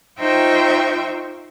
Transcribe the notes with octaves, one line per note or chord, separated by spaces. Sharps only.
D#4 F4 C5 E5 G5 C#6